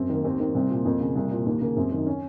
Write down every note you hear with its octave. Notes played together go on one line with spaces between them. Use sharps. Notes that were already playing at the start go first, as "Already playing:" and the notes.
Already playing: F#2 C4
D#3 A#3
D#2 C4
D#3 C4
C2 C4
A#2
F2 A#3
C#3
C2
A#2
D#2 A#3
C#3 A#3
F#2 C4
D#3
D#4
C#4